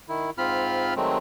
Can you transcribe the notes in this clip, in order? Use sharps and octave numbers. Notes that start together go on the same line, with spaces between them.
D#3 E4
G#2 C4 F4 B5 F6
D#3 F#3 G#3 A3 C4